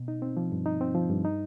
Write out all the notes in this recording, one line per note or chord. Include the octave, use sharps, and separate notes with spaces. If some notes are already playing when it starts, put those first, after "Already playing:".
Already playing: B2
D#4
C4
F3
G2
D#4
C4
F3
G2
D#4